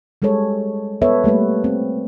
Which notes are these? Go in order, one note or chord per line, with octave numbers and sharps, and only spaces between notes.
G3 G#3 G#4 A4 C#5
B3 A4 B4 C#5 E5
G3 A3 A#3 B4
C4